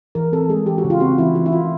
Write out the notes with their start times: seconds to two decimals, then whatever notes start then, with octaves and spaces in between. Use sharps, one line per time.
0.15 E3 A#4
0.32 C4 A4
0.49 G#3 G#4
0.66 E3 G4
0.78 F#4
0.84 C#3
0.90 F4
1.00 C4 F#4
1.18 E3 E4
1.35 E3 F#4
1.46 E4
1.52 E3 F4